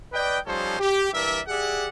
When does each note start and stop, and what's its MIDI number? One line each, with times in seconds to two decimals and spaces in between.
0.13 0.38 71
0.13 0.38 74
0.13 0.38 75
0.13 0.38 79
0.46 0.79 53
0.46 0.79 55
0.46 0.79 61
0.46 0.79 63
0.46 0.79 69
0.46 0.79 72
0.80 1.09 67
1.13 1.39 43
1.13 1.39 52
1.13 1.39 70
1.13 1.39 74
1.13 1.39 76
1.47 1.89 67
1.47 1.89 68
1.47 1.89 74
1.47 1.89 76
1.47 1.89 78